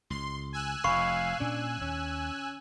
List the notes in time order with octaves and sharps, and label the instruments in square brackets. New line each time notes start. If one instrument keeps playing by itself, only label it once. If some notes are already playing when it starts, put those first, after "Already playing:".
[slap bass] C#2 [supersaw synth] C6
[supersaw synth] G#5 E6 F#6
[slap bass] F1 F3 [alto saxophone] F5 [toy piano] B5 C#6
[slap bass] A#2 C#4 [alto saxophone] D4
[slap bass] D#2 [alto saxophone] C#4